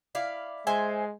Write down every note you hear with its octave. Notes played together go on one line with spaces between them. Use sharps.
E4 D5 F5
G#3 C5 E5 G#5